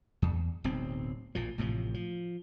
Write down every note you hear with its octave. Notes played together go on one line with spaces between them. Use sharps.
E2
D1 B1 C4
A#1 A#2 F3
A1 A2 C3 F3
F3